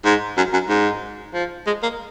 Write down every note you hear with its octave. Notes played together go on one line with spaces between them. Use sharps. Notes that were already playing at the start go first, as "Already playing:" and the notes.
G#2
F#2
F#2
G#2
F3
G#3
A#3